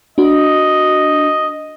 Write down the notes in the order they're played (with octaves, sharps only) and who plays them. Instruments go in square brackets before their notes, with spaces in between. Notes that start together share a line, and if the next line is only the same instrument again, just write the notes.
[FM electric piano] D4 F#4 [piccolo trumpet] D#5